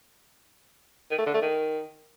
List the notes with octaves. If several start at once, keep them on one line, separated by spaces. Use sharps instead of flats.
D#3
A3
D3
A3
D#3